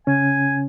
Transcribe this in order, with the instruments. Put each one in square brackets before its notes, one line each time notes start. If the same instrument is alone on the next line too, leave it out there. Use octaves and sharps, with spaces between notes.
[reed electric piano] C#3 C#4 [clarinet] G#5